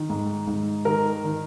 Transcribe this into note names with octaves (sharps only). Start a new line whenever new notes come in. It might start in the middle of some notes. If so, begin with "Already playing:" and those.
Already playing: D#3
G#2
G#2
D#3 A#4
D#3